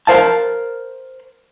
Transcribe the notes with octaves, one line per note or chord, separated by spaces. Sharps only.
A#4 C5 F5 A5